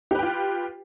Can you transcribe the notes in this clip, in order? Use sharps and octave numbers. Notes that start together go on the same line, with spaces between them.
F4 G4 B4 G5